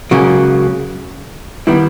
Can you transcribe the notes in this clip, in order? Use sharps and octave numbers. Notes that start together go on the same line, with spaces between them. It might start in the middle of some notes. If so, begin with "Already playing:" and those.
C#2 C#3 F#3 A#3
D#3 G3 B3 E4